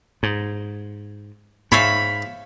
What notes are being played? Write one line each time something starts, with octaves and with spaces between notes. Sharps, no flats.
G#2
G#2 C#5 E5 F5 B5